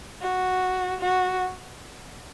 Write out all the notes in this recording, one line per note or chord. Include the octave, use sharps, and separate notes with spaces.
F#4
F#4